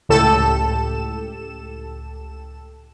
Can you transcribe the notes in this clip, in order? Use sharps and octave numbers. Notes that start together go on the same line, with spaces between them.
C#2 A2 G4 A4 E7